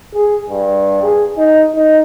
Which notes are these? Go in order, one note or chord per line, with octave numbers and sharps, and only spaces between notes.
G#4
G2
G#4
D#4
D#4